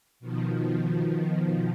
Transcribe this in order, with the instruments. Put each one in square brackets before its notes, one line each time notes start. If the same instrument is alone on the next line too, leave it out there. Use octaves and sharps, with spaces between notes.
[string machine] B2 D#3 F3